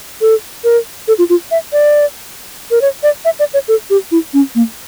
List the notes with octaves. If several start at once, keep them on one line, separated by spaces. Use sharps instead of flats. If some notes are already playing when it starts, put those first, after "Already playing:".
A4
A#4
A4
F4
F4
E5
D5
A#4
C#5
D5
E5
D5
C#5
A4
G4
E4
C#4
A#3